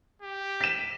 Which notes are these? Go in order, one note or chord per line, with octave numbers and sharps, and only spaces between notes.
G4
B6 E7